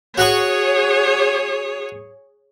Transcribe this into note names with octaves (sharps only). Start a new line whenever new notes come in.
F#4 G#4 C#5 F#5 C#6